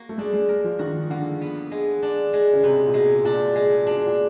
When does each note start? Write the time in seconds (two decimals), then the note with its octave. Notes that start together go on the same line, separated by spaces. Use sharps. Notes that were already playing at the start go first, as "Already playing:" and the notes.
Already playing: A#3 F#4
0.09 A3
0.18 G#3 D4
0.34 G#3
0.49 A#4
0.64 F3
0.79 D#3 F#4
1.10 D3 A#3
1.41 B3
1.71 G#3
2.02 D4
2.33 G#3
2.53 C#3
2.63 C3 B3
2.87 A#2
2.94 B2 G#3
3.25 A#2 D4
3.55 G#3
3.86 B2 D4
4.07 A#2